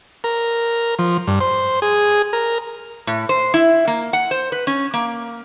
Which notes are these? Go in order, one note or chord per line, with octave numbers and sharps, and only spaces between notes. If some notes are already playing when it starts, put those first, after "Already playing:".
A#4
F3
G2
C5
G#4
A#4
A2
C5
E4
A#3
F#5
C5
B4
C#4
A#3